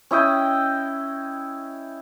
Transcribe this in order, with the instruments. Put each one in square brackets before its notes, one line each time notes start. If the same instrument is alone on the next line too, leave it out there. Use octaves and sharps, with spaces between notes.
[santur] C#4 E4 D#5 G5